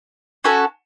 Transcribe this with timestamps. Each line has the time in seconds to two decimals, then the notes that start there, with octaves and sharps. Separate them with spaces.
0.44 C#4 F#4 A4 G#5